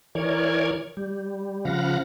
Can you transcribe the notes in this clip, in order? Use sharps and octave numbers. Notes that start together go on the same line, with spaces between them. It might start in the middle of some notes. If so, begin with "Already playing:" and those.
E3 A#4 C#5 D5 G#6
G3
C#3 F3 F5 F#5 B5 A#6